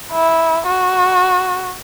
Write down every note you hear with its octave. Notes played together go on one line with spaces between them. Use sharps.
E4
F#4